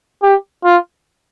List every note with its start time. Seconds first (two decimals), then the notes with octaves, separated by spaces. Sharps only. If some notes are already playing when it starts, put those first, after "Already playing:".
0.22 G4
0.64 F4